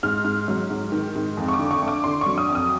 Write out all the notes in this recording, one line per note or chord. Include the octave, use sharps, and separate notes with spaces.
G#2 F6
G#2
F#3
G#2
D#3
G#2
F2
C#6
D6
D3
C#6
A3
D6
D3 C6
F#3 C#6
D#6
F2
D#6